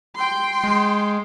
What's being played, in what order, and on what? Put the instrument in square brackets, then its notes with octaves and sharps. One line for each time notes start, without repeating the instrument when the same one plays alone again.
[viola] G5 C6
[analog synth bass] G#3